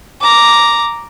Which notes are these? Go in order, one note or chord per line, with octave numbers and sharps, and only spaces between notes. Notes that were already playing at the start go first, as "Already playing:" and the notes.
A#5 D6